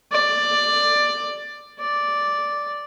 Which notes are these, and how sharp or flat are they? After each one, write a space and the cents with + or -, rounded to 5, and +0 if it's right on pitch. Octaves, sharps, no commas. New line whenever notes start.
D5 +10
D5 -5